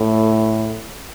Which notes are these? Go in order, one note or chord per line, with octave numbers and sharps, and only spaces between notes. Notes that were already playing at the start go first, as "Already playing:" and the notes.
Already playing: A2